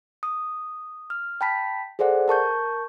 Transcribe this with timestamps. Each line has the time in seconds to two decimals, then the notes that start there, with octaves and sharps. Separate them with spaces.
0.23 D#6
1.10 F6
1.41 G5 A5 B5 B6
1.99 G#4 A4 C5 D5 F#5
2.28 A#4 A5 C#6 G6